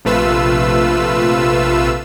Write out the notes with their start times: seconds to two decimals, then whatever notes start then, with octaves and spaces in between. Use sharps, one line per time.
0.05 A#1 C3 A3 F4 B4 E6